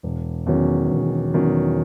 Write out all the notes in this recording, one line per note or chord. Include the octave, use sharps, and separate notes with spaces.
E1
E2 D#3 F#3 C#4
E1
E2 D#3 F#3 C#4